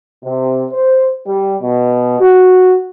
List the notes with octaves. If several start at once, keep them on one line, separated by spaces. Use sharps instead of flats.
C3
C5
G3
B2
F#4